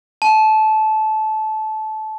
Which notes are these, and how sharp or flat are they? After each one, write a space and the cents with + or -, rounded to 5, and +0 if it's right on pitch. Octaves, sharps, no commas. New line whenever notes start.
A5 -20